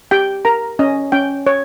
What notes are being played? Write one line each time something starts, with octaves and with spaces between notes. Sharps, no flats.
G4 G5
A#4 A#5
C#4 D#5
C#4 G5
C#5